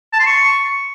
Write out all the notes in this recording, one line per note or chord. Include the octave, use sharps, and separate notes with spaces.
A5
C6
C#6